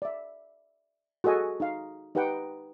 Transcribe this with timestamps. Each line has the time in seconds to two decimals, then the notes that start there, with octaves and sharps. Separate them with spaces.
0.02 D5 E5
1.24 F#4 G#4 A4 D#5 G#5
1.60 D#4 F5
2.15 D#4 G4 B4 F#5 G5